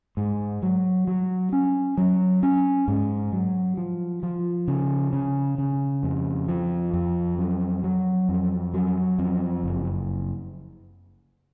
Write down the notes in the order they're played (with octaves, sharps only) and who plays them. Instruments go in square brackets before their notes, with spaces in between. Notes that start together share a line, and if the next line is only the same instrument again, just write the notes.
[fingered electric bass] G#2
F#3
F#3
C#4
F#3
C#4
G#2
F#3
F3
F3
C#3
C#3
C#3
F2
F3
F2
F#3
F#3
F2
F#3
F2
F#1